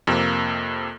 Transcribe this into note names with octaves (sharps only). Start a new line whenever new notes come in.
F2 C3 A#3